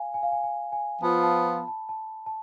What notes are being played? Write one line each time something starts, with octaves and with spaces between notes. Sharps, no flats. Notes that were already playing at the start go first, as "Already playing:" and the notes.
Already playing: F5 G#5
G#5
F5
G#5
G#5
G#5
F3 B3 F4 A5
A5
B5
A5
A5
A5